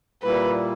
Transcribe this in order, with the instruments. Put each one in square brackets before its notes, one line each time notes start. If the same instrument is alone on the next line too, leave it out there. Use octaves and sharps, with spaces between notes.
[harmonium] A#2 G3 A#3 E4 [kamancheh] B4